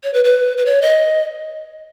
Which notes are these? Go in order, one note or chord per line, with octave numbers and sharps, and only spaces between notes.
C#5
B4
B4
B4
C#5
D#5